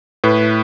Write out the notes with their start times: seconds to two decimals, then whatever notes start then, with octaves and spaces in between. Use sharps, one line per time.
0.24 A2 B4